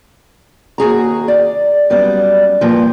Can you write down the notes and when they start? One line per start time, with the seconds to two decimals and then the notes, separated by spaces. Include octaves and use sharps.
0.78 D#2 F#4 G#4 A#5
1.28 D5
1.90 F#2 G3 B3 D5
2.61 G2 A#2 F3